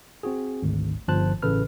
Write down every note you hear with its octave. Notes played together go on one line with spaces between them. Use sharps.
C4 F#4 G#4
G#1 D2
G1 F3 C5 A5 F#6
A1 C#3 A4 B4 F6